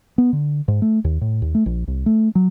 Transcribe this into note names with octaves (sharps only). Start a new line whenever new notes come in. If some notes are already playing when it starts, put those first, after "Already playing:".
B3
D3
G#2
A3
D#2
A2
D#2
A3
A#1
C2
A3
F#3